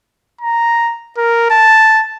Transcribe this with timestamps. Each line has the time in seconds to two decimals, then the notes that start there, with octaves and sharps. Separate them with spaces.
0.41 A#5
1.17 A#4
1.50 A5